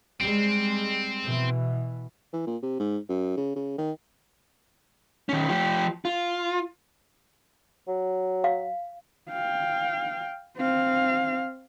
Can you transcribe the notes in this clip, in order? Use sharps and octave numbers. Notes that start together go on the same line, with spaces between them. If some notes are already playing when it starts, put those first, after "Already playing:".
G3 G#3 C4
B2 E3
E3
A#2
C3
G#2
F#2
C#3
C#3
D#3
D#3 C#4
F3 G4
F4
F#3
F5
F5 G5
C4 F5